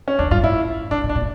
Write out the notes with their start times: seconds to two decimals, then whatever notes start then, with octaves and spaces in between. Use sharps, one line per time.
0.08 C#4
0.19 E2 D4
0.31 G2 F4
0.43 A2 E4
0.91 A2 D4
1.04 A2
1.09 D4
1.16 A#2